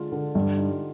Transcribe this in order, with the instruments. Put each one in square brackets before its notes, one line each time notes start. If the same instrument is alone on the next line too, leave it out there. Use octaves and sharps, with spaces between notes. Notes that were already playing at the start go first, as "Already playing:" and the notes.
Already playing: [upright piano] D3 G#3 D4 F4
D3
[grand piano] G2 [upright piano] G4
[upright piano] D#4